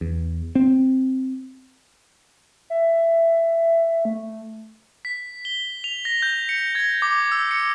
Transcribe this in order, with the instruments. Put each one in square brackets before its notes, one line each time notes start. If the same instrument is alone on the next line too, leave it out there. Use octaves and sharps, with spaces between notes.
[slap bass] E2
C4
[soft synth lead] E5
A3
[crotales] B6
G7
F7
A#6
G6
C#7
G#6
D6
E6
C#7